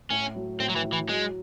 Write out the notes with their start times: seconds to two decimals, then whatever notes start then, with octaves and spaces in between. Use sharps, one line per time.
0.10 A2 C#4
0.35 F#3
0.59 A2 C4
0.69 F#3
0.76 E3
0.84 E4
0.93 E3
1.09 F#3 G#3